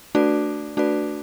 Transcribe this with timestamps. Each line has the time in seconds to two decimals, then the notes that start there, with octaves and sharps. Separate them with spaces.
0.15 A3 D4 F#4 B4 D5
0.77 A3 D4 F#4 B4 D5